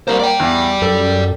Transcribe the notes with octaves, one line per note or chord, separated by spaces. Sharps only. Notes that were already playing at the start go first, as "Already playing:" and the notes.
G3 A#3 C5
D5 G5
E2
F#2 A4